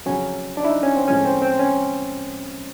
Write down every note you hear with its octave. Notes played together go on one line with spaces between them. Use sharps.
F2 C#3 F#3 C#4
D4
E4
D#4
C#4
C4
A2 F3 G#3 C#4
C4
C4
C#4